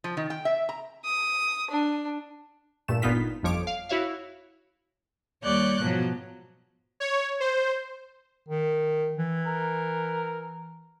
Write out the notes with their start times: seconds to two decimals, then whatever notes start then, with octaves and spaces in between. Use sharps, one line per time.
0.04 F3
0.17 D#3
0.30 G5
0.45 E5
0.69 A#5
1.05 D#6
1.70 D4
2.88 G2 A#2 A3 E7
3.02 G1 A#2 B3 D#4 F4 B6
3.43 G1 F2 F3 C#5 D6 D7
3.67 F5
3.89 E4 F#4 C#5 E5 F5
5.43 D#2 G3 C#5 D5 F#6 G6
5.80 G#2 B2 F3 F#3
7.00 C#5
7.40 C5
8.48 D#3
9.18 E3
9.46 A#4